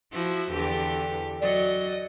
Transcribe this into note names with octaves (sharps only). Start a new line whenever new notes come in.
F3 E4 F#4
E2 D3 G4
F#3 D5 D#5